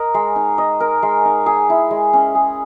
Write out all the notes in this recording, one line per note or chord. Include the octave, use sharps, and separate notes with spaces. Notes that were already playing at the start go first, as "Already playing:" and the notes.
Already playing: A#4 D#5
G#3
D#4
D#5
A#4
G#3
D#4
G#4
E4
G#3
C#4
G#4